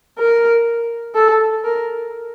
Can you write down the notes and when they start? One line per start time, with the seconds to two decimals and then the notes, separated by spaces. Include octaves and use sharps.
0.19 A#4
1.15 A4
1.64 A#4